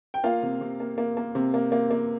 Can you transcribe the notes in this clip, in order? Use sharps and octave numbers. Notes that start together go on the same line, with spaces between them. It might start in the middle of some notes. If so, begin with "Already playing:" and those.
G5
A#3 F4 F5
C3
C3
A#3
A#3
A#3
C3
A#3
A#3
A#3